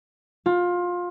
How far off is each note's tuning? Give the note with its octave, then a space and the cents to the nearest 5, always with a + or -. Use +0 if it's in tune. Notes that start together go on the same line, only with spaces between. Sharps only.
F4 +20